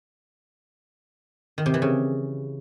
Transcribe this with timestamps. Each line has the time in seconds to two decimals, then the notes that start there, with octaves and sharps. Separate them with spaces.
1.58 D#3
1.66 C3
1.74 E3
1.82 C#3